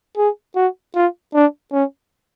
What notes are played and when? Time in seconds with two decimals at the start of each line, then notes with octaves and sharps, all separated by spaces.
0.17 G#4
0.56 F#4
0.95 F4
1.34 D4
1.72 C#4